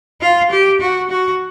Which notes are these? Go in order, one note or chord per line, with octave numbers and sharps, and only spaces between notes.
F4
G4
F#4
F#4